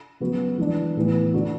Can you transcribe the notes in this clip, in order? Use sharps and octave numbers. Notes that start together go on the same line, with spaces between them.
C#3 F#3 B3 F#4
E3 G#3 D4
A2 E3 B3
D3 A3 D4 F#4